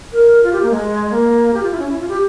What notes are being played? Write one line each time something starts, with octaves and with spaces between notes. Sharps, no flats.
A#4
F4
G4
A#3
G#3
A#3
G4
F4
E4
C#4
E4
F4
G4